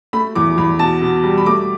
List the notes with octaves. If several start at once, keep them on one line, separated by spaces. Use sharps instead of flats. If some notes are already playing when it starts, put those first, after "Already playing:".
A3 B5
E2 D6
E2 B5
B2 A5
B2
G3
B5
A3 D6